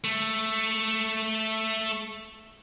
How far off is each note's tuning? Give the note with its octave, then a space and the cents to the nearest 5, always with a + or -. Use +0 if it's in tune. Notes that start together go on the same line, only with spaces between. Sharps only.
A3 +0